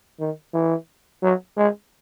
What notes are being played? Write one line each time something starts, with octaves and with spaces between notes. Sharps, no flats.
D#3
E3
F#3
G#3